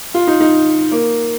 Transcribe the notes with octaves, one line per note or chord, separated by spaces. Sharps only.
F4
D#4
D#4
A#3